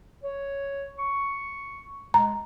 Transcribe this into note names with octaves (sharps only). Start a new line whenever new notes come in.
C#5
C#6
G#3 A#5